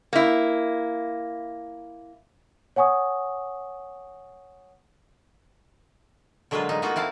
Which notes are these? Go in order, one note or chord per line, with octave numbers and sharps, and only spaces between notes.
A#3 E4
C#5 F#5 G#5 C#6 D#6
D3 F#3 G#3 A#3 F4 B4
G#3 D#4
A#3 B3 D#4 F4 F#4
C4 E4 F5 A5